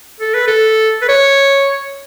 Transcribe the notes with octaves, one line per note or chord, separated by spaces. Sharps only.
A4
B4
A4
B4
C#5